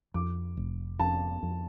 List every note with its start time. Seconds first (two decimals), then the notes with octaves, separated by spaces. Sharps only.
0.14 F2 D6
0.57 F1
0.99 F2 A5
1.43 F2